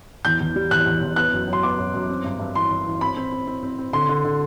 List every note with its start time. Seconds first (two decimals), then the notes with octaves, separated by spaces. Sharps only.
0.25 E2 G6
0.40 E2
0.56 G3
0.71 E2 F#6
0.86 E2
1.01 E2
1.16 B3 F#6
1.33 F#2
1.48 F#3
1.53 C6
1.63 B3 D6
1.78 F#2
1.94 F#2
2.09 C4
2.24 G2
2.39 G2
2.55 E3 C6
2.71 E3
2.86 E3
3.01 C4 B5
3.17 C4
3.32 C4
3.47 C4
3.63 C4
3.79 C4
3.93 D3 C6
4.09 D3
4.25 D3